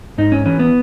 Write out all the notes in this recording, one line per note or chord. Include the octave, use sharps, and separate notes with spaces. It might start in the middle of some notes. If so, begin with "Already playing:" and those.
G#2 D#4
C#4
E3 C#4
B3